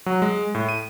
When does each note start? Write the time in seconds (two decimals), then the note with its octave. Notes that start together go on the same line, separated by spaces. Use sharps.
0.06 F#3
0.22 G#3
0.55 A2
0.69 D#7